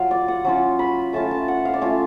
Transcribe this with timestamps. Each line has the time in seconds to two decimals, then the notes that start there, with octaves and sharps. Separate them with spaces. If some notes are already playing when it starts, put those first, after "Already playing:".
Already playing: F#3 F4 F5
0.11 D5
0.28 F#5
0.44 F#3 C#4 F4
0.79 B5
1.13 A3 C#4 F4 A5
1.31 A5
1.48 F#5
1.65 F5
1.74 D5
1.81 A3 C#4 F4 F5